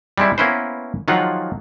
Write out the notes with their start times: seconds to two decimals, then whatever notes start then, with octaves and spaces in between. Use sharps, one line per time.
0.18 G3 G#3 C4 E4
0.38 A#3 B3 C#4 E4 B4 C5
1.08 D#3 F3 F#3 G#3 F4 F#5